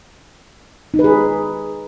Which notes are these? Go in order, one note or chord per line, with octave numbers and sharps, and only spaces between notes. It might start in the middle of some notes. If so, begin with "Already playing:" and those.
D#4
B4
G#4